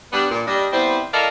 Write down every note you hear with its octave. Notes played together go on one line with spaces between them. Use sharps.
G3 B3 D4
A#2
G3 D4 D#5
G3 B3 C4 E4 C5
E4 A4 A#4 D5 D#5 F5